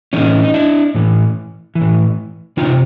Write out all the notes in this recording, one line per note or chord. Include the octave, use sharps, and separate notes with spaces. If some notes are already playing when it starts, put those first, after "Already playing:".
A2 E3 C#4 D#4
D#4
D4 E4
A2 E3
E3
A2
C3 D#3 D#4 F4